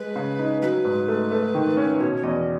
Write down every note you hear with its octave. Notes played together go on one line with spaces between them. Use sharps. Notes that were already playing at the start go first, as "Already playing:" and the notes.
Already playing: G#3 B4
C#3
D#4
F#3 B4
G#2
A3
A3
D#3
C#4
B2 C#5
C#5
E2 D#5